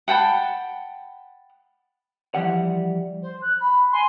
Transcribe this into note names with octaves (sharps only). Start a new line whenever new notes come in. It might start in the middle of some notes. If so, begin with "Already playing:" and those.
F#5 G5 A5 B5
E3 F3 G3 F#5
C5
F#6
B5
G#5 C6